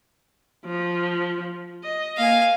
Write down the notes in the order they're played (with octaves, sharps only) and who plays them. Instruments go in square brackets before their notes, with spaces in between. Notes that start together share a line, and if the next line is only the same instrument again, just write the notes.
[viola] F3
D#5
[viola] A#3 G#5 [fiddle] F5